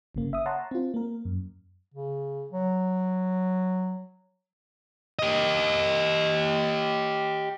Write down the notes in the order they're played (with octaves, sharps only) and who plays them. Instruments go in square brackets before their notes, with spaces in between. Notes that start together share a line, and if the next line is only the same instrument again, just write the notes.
[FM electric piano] G1 C#3 A#3
E5 D#6
C#5 F#5 A5 A#5 C6
C4 F4
A#3 A#4
F#2
[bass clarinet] C#3
F#3
[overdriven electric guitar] G4 D#5